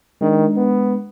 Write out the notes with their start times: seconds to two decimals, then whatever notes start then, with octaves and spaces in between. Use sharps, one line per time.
0.21 D#3 G#3 D4
0.57 B3